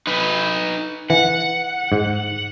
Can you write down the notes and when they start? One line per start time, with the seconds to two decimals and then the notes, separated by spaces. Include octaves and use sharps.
0.07 D#4 B4
1.10 E3 F#5
1.92 G#2